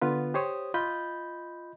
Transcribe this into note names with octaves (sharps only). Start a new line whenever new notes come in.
D3 B3 F4 B4
G4 C5 C#5 D#6
F4 D#5 B5 G6